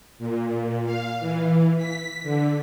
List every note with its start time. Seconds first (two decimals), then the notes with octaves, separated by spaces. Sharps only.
0.19 A#2
0.85 F5
1.20 E3
1.77 B6
2.23 D3